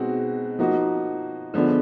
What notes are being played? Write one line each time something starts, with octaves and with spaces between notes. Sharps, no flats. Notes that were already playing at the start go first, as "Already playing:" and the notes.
Already playing: B2 G#3 C4 D#4 F#4
F3 A#3 D#4 F#4
D3 F3 G#3 B3 D4